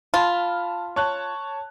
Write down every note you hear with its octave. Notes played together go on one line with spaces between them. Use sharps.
F4 A5 B5 F6
C#5 A5 F#6